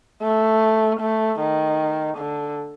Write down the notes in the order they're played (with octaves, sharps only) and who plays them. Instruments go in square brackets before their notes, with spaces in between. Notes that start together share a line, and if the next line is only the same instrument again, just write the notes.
[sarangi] A3
A3
D#3
D3